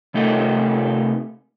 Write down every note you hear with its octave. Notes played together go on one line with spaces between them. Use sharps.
C3 A3 D#4 G4 A4 A#4